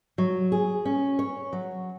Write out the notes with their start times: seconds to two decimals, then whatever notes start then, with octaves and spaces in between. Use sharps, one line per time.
0.18 F#3
0.52 G#4
0.85 C#4
1.19 C#5
1.53 F#3